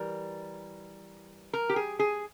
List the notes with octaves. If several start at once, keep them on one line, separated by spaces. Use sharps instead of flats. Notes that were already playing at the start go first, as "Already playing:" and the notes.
Already playing: E3 G3 A#4
A#4
G4
G#4
G#4